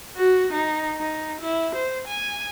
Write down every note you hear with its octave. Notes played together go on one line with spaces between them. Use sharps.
F#4
D#4
D#4
E4
C5
G#5